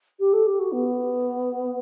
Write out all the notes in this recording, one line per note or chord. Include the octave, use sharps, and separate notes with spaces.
G4
A4
G4
F#4
B3